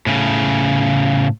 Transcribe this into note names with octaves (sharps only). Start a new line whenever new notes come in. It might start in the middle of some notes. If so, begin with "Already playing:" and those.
A2 C#3